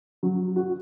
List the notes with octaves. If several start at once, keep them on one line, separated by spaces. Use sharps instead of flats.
F#3
F#4